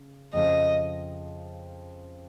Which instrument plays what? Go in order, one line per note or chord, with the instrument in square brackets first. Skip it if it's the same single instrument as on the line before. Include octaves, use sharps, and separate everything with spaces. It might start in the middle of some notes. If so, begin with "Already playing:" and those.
Already playing: [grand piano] C#3
[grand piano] F2 C#3 F3 [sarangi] D#5